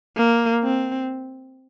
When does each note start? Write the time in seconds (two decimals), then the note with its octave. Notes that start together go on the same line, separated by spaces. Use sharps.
0.17 A#3
0.63 C4